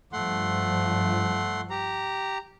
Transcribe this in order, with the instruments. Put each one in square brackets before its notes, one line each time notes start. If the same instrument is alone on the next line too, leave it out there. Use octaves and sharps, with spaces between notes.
[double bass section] G2 F3 [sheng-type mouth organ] A3 F#5 C6
[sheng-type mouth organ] G4 A#5